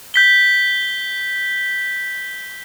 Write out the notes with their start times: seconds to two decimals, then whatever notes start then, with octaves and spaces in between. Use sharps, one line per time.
0.14 G6 B6 G7